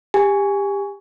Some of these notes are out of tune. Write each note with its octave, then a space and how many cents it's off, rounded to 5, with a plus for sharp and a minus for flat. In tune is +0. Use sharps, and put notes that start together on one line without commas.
G4 +25 G#5 +0